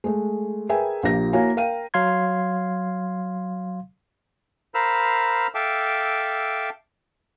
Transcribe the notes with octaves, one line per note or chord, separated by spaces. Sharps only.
G#3 A3
G#4 A#4 B4 E5 G5 G#5
A#1 F3 A#3 G4 A#6
A#3 E4 F#4 C#5 F5 G#5
A#4 F5 G5 D#7
F#3 F5 C6 G#6
A#4 C5 F5 B5 E6 F6
A4 E5 F5 G5 D6